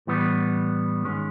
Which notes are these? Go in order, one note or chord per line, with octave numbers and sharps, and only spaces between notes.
A2 E3 G3 B3
G#2 D#3 G#3 C#4